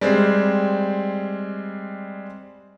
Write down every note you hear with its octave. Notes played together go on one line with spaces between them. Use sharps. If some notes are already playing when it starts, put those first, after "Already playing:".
G3 G#3 C4